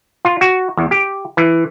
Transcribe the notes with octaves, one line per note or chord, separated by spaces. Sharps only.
F4
F#4
E2
G4
E3